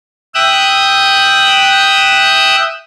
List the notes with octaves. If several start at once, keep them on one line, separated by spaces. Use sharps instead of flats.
E5 G5 D#6 E6 F#6